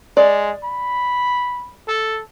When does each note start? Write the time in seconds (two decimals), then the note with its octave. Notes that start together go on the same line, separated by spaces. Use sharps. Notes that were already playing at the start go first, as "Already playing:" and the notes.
0.17 G#3 D5
0.64 B5
1.88 A4